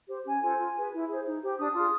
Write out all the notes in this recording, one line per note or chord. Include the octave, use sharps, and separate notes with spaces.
G4 C5
C#4 G#5
F4 A4 C5 G#5
F4
G#4 B4
E4
G#4 C5
D#4
G4 C5
D4 D#6
F4 G#4